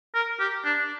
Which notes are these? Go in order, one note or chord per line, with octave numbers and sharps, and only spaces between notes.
A#4
G4
D4